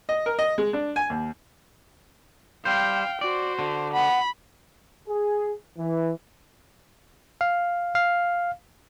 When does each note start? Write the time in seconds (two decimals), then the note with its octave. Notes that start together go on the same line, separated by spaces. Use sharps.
0.09 D#5
0.26 A#4
0.39 D#5
0.58 G#3
0.73 D4
0.96 G#5
1.10 D#2
2.65 G3 C5 F5 G5
3.21 F#4 C5 D5
3.59 D3
3.94 F#5 B5
5.08 G#4
5.78 E3
7.41 F5
7.95 F5